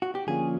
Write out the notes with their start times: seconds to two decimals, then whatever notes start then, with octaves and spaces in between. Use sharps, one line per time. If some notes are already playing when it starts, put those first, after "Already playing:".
0.02 F#4
0.15 G4
0.27 D3 F3 A#3 C#4 F4 G#4